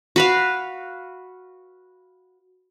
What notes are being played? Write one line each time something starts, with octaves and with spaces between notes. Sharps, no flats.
F#4 B4 F5